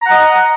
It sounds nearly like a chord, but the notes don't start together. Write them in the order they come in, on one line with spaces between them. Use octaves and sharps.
A#5 F#5 D#5